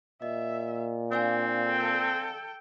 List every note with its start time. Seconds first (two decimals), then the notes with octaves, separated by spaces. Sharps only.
0.22 A#2 D#5 E5
1.12 C4 D4 D5 F5 G#5
1.67 A4 G5